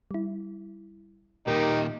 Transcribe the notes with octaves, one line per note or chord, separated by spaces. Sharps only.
G3 E4
A#2 D#3 A#3 D#4 G4 A#4